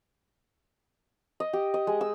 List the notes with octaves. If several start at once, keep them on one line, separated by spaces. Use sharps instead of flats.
D#5
G4
D#5
G#3
E6